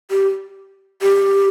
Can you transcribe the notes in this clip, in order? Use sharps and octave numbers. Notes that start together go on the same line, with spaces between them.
G4
G4